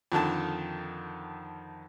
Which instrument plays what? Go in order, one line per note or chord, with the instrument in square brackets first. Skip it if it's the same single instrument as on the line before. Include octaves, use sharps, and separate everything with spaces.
[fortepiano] F2 D3 D#3 A5